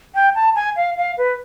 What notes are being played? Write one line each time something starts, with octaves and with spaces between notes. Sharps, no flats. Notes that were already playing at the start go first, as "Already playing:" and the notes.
G5
A5
G#5
F5
F5
B4